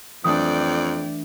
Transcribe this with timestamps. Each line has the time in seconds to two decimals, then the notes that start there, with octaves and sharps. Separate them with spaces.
0.24 F2 E3 A3 D4 D5 G5 D#6